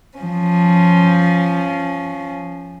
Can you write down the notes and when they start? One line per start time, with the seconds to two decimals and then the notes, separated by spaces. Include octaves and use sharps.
0.18 F3 C#4